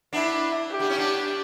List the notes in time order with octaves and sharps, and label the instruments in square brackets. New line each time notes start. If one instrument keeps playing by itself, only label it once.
[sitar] B3 D4 [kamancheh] E4
[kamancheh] G4
[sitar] B3 D4
C#4 E4
B3 D4